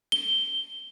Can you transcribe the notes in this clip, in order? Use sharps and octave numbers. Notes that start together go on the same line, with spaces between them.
G7